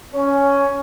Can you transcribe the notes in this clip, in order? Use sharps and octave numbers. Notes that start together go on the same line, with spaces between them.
C#4